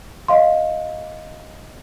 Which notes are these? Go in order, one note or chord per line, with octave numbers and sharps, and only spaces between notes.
D#5 F5 C6